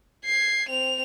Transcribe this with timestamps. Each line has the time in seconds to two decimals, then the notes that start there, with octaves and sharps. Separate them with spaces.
0.25 G#6 C7
0.69 C4 F7